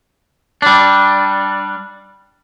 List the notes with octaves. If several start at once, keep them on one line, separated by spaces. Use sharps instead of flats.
G3 D4